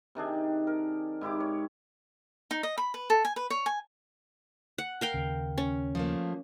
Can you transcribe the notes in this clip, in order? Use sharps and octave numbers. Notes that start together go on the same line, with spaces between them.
C3 D#3 D4 G#4
A#4
G#2 E4 G4 D6
C#5
D#4
D#5
B5
B4
A4
G#5
B4
C#5
G#5
F#5
A#4 F5 G5
D#2 C#3
C#4
F3 A3 A#3